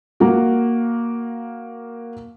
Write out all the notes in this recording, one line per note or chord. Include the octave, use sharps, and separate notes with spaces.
A#3 F#4